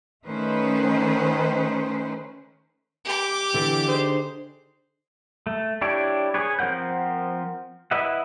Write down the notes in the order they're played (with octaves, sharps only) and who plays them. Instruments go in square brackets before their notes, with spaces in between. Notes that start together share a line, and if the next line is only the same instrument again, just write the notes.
[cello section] D#3 A3 C#4 B4 C5
[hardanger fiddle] G4 D6
[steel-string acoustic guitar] D3 [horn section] E3
[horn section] D#4 G#4 C5
[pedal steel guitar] A3
D4 E4 G4 C#5
G#4 B4 C#5
F3 C4 A#4 F#5 G6
E4 B4 D#5 E5 F#5